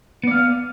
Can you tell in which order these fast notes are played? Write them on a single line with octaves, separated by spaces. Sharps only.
B3 D5 F5